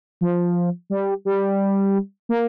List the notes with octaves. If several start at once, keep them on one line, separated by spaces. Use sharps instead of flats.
F3
G3
G3
A#3